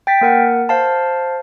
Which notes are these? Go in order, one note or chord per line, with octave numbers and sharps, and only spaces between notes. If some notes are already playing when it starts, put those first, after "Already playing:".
G5 A6 B6
A#3 A#4 F#5
C5 F5 A5